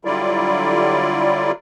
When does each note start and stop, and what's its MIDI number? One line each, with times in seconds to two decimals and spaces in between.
0.05 1.51 50
0.05 1.51 54
0.05 1.51 55
0.05 1.51 64
0.05 1.51 65
0.05 1.51 74